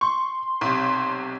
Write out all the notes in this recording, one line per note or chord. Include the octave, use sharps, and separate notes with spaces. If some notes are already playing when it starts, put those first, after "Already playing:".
C6 C#6
B1 C3